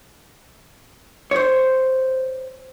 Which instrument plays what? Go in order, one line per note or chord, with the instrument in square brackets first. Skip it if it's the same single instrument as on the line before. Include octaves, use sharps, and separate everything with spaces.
[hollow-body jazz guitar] C5 C#5